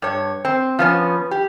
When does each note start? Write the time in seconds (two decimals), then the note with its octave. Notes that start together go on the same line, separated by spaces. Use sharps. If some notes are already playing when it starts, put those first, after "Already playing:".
0.02 G2 C#5
0.45 C4
0.79 F3 B3 C#4
1.31 G4